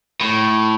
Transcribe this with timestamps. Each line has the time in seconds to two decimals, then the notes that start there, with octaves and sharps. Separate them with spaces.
0.21 A2